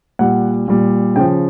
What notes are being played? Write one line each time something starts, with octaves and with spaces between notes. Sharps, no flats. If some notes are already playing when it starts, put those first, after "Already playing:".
A#2 G3 F#5
A#2 G3
C#3 F3 G5